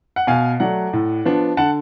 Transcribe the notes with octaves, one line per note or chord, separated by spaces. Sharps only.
F#5
B2 F5 G#5
F#3 A3 D5 F#5
A2
F3 B3 D4
D3 F#5 A5